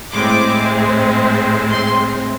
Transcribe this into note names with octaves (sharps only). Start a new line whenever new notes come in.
A2 G#3 C4 D6
C6